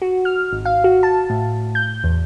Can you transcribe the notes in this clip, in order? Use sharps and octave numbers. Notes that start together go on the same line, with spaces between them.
F#4
F6
G#1
F5
F#4
A5
A2
G6
E2